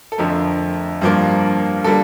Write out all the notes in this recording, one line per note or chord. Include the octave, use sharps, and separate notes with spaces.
A4
F2 D3 F3 A3 A#4
G2 F3 A#3
D3 G3 A#3 A4